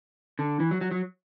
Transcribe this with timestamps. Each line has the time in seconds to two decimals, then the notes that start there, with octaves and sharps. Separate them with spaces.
0.39 D3
0.60 E3
0.71 F#3
0.81 F#3
0.91 F#3